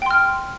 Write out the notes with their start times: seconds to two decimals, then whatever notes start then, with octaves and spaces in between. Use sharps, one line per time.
0.02 G5
0.06 C6
0.11 F6